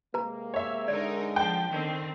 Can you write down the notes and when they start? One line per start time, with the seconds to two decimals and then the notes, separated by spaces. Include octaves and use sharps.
0.14 C3 G#3 A#3 B4 A#5
0.54 C#5 E5
0.88 D3 G#3 D#4 A#4 D5
1.36 F3 G5 A5
1.69 D3 D#3 C4